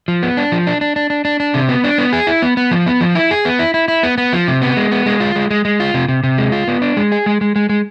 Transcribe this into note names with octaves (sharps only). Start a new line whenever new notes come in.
F3
B3
D4
F3
D4
D4
D4
D4
D4
D4
C3
B3
D4
B3
G#4
E4
B3
B3
F3
B3
F3
E4
G#4
B3
E4
E4
E4
B3
B3
F3
C3
B3
G#3
B3
G#3
F4
G#3
G#3
G#3
F4
C3
C3
C3
G#3
F4
B3
D4
G#3
G#4
G#3
G#3
G#3
G#3